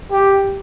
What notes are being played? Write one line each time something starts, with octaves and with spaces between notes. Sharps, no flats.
G4